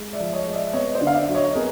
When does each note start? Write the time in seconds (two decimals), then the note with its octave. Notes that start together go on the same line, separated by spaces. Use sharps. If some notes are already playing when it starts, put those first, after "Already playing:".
Already playing: G#3
0.13 D5 E5
0.20 F3
0.33 C#5 D#5
0.47 G#3
0.53 D5 E5
0.73 B3 C#5 D#5
0.94 C5 D5
1.01 D3
1.07 F5
1.14 D5 E5
1.29 F#3
1.35 C#5 D#5
1.54 B3 G#4 A#4